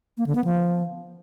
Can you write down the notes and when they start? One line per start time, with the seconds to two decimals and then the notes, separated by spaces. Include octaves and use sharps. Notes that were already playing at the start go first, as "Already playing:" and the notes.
0.18 A#3
0.27 D3
0.35 B3
0.44 F3